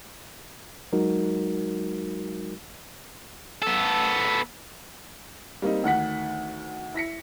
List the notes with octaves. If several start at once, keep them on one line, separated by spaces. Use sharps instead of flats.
F#3 G#3 D#4 F#4 A#4
B3 A4
G3 A#3 C4 D#4
D2 D#3 F#5 B6
E4 A#6 B6 C#7